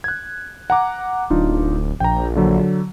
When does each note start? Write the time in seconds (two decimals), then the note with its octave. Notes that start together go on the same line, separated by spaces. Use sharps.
0.04 F#6 G#6
0.70 F#5 A#5 D6
1.30 D1 D4 D#4 F4
2.00 A#1 G5 A#5
2.36 D3 F#3